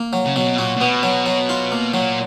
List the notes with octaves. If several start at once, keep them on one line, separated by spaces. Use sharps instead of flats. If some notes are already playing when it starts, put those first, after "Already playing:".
Already playing: A#3
F#3
C#3
B2 F#3
A#2 F#4
A#2
B2 B3
F#3
F#3
F4
A#3
A#2 F#3